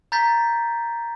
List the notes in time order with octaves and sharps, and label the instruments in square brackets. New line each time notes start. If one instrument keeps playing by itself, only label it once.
[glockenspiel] A#5 G6 A6 B6